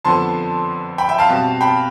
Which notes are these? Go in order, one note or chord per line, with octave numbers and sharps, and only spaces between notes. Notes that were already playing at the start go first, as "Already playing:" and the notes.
F2 D3 F3 B3 A5 C6
G5 B5
E5 G5
F5 A5
B2 G3 C4
G5 B5